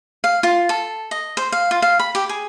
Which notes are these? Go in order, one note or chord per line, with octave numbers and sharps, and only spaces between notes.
F5
F4
A4
D#5
C5
F5
F4
F5
B5
G4
G#4